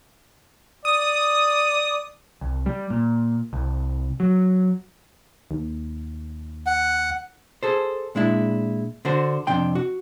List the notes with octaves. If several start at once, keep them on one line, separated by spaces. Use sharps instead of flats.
D5 D#6
C2
G3
A#2
C2
F#3
D#2
F#5
G#4 A4 C5
A#2 G#3 D4 E4
D3 D4 F#4 C5
F2 C3 D4 G5 C6
F#4